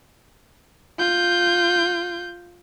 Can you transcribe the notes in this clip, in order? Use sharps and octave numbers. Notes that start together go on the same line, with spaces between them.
F4 G6